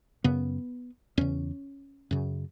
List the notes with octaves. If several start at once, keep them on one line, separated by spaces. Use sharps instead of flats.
F#2 C#3 B3
E2 C#3 C#4
F#2 C#3